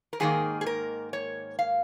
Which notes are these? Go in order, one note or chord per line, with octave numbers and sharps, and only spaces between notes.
A#4
G#2 D#3 A#3 G#4
G#4
A#4
C#5
F5